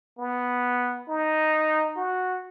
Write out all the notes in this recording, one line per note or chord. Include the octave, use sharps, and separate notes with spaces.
B3
D#4
F#4